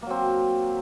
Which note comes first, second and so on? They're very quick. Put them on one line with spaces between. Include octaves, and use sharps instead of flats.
A#3 F#3 C4